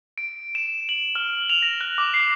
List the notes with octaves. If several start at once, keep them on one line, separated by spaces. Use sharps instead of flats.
D7
E7
F#7
F6
F7
A#6
F#6
D6
C7